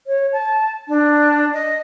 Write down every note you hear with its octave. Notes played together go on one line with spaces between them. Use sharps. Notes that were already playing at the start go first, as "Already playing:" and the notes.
C#5
A5
D4
D#5